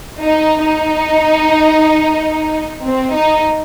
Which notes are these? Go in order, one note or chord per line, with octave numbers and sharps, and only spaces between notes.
D#4
D#4
C4
D#4